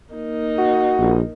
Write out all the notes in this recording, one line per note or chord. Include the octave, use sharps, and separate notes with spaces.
A#3 D#4
F#4
A#1